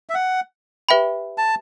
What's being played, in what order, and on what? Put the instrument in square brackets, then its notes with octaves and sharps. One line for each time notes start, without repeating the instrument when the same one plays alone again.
[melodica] E5
F#5
[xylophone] G4 B4 E5 G5 B5
[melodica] A5